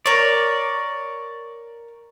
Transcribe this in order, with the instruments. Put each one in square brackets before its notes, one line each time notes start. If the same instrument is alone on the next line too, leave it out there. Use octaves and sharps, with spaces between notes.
[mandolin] A#4 C#5 [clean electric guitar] D5